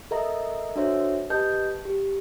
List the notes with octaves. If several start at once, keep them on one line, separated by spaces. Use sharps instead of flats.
A4 A#4 D#5 E5 A#5
D4 F#4 A4 C5 C#5 E5
G4 B4 D#5 A5 G6
G4